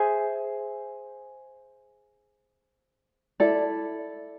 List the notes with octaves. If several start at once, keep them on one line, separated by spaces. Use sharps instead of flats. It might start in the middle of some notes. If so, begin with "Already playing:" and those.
Already playing: G#4 C5 E5 G#5
E4 A4 D5